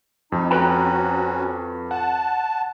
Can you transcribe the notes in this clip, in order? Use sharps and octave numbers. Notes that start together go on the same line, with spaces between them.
F2 D#4
C#4 F#4 B4 G5 A#5
F#5 A5